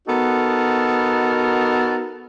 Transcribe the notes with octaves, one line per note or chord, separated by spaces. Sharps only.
B3 D#4 F#4 A4 A#4